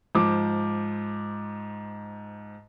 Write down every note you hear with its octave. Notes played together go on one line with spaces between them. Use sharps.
G#2 F3 D6